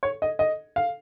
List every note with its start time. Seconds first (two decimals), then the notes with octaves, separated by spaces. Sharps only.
0.03 C#5
0.22 D#5
0.39 D#5
0.76 F5